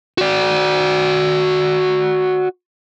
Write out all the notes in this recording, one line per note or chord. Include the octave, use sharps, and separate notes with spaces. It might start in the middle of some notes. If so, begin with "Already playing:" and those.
F#4 D5